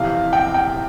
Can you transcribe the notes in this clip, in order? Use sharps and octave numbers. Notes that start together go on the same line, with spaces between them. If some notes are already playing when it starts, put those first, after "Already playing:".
Already playing: F2 C3 E3 F5
G5
G5